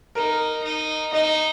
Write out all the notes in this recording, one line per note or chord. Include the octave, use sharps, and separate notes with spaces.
D#4 A#4
D#4
D#4 D#5